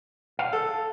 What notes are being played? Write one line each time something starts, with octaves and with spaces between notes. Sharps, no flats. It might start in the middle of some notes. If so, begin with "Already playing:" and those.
F5
A4